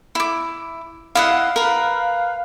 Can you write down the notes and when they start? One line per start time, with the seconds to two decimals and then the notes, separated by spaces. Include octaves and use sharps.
0.15 E4 D6
1.15 E4 D#5 F5 F#5
1.56 A#4 B4